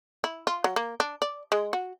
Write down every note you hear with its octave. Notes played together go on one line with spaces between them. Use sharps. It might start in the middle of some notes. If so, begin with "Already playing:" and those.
E4
F4
F#3
A#3
D4
D5
G#3
F#4